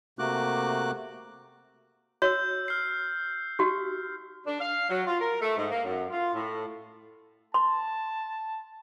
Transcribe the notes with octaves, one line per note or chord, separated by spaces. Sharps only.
C3 A3 A#3 F#4 D6 F#6
F#4 C#5 E6 G6
F6 C7
F#4 G4
D4
F5
F#3
F4
A#4
A3
G#2
A#3
F#2
F4
A2
A5 C6